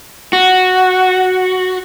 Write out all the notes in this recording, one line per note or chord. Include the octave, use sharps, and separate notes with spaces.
F#4